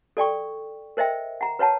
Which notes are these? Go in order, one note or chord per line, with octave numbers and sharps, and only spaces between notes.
A4 D5 G5 C#6
A#4 C5 D#5 E5 G5
F#5 A#5
B4 C#5 F#5 A5